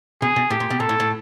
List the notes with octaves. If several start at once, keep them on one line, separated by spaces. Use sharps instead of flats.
B2 G#4
B2
A2 G4
A#2
B2
A#2 A4
A2
A2